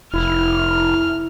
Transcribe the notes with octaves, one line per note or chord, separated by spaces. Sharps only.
F1 E4 F6